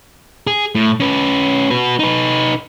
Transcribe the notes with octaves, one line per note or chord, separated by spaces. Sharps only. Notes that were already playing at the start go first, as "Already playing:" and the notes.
G#4
A2
C#4 B4
F#4 B4
D#4 B4